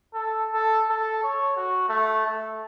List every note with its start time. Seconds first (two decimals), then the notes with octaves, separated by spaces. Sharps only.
0.14 A4
0.53 A4
0.89 A4
1.23 C#5
1.57 F#4
1.89 A3
2.26 A3